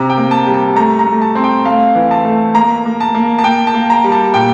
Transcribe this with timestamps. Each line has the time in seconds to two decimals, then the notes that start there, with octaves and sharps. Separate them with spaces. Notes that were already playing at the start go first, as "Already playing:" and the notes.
Already playing: C3 A#5
0.10 G5
0.17 A#3
0.31 A5
0.47 G3
0.54 A5
0.76 A3 A#5
0.99 A#5
1.07 A3
1.22 A5
1.35 C4
1.44 G5
1.65 A3 F5
1.95 E3
2.11 A5
2.25 A3
2.55 A#3 A#5
2.86 A#3
3.00 A5
3.15 A#3
3.39 A5
3.44 A#3 G5
3.67 A5
3.74 A#3
3.90 A#5
4.04 G3
4.12 A5
4.34 A#2 G5